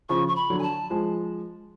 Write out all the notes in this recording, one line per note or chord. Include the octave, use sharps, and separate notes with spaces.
C#3 F3 C#6
C#6
B5
D3 F#3
G#5
A5
F3 G#3